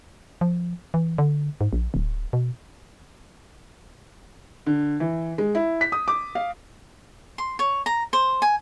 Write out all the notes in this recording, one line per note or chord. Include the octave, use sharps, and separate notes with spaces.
F3
E3
D3
G#2
A#1
D1
B2
D3
E3
G#3
E4
B6
D#6
D6
F5
C6
C#5
A#5
C5
G#5